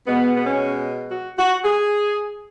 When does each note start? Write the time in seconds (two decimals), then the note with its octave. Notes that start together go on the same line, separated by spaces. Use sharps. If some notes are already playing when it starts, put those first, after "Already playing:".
0.07 B2 G#3 B3
0.36 B3
0.46 C#4
1.11 F#4
1.38 F#4
1.64 G#4